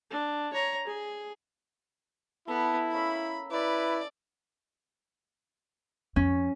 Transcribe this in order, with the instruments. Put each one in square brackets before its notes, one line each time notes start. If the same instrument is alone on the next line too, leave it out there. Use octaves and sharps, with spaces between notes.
[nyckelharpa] D4
C#5 A#5
G#4
[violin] B3 [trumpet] E4 [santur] A4 D6
[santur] A#3 C#4 E5 [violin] B5
[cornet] E4 [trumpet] B4 [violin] D5
[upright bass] F2 [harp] C#4